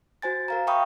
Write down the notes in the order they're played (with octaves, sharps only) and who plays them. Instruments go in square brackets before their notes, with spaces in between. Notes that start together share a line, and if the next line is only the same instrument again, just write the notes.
[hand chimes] F#4 C5 G#5 A6
A#4 F5 A#5
E5 F5 G5 B5 C#6 D#6